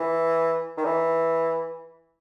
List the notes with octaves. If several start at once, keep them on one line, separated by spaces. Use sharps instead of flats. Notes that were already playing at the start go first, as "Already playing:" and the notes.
Already playing: E3
D#3
E3